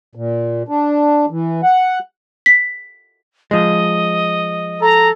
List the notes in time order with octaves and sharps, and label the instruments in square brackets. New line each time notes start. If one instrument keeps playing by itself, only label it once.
[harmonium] A#2
D4
E3
F#5
[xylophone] B6
[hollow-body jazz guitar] F3 G#3 [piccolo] D#5
[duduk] A4 [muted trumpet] A#5